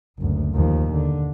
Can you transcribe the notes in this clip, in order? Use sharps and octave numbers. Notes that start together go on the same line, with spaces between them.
F#1 D2
D#2 F3
D3